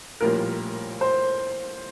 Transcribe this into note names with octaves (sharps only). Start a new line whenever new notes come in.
A#1 A2 G3 A#3 F4 A#4
C5